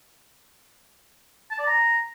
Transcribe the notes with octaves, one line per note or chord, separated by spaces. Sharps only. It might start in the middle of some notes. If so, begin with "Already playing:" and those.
A5
D5
A#5